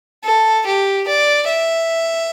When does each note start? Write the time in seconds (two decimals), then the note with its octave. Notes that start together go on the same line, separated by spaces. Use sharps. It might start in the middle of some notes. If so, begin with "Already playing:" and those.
0.24 A4
0.66 G4
1.08 D5
1.49 E5